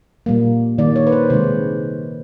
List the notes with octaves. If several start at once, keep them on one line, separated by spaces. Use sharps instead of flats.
A#2 G3 A#3
D#3 G3 A#3 D5
C#5
B4
C5
C3 D#3 G#3 C5